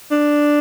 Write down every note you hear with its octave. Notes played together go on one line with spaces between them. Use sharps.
D4